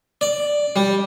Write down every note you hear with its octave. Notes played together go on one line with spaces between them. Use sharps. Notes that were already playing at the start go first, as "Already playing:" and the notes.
D5
G3